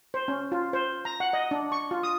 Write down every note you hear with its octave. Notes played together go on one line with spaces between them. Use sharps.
C5
C#4
F4
C5
A#5
F#5
D#5
D4
C#6
F4
D#6